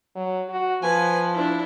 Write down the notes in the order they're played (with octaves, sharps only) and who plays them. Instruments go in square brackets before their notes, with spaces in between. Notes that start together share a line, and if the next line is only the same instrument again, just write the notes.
[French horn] F#3
F#4
[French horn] F3 [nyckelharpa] B4 G#5
[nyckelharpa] D4 E4